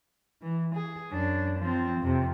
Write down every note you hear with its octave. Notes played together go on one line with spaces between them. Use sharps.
E3
G#4
F#2 D4
F3 C4
F2 C3